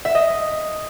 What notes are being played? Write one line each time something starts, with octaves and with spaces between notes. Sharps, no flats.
E5
D#5